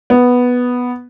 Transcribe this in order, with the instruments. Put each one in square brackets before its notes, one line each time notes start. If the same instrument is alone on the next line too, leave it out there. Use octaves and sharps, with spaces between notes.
[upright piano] B3